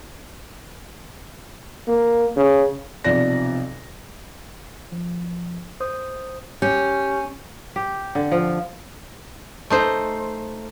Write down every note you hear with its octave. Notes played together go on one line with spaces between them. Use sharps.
A#3
C#3
B1 C3 F3 D5 A#6
F3
C5 D#6
C#4 G4 G6
G4
D3
F3
A3 D#4 C5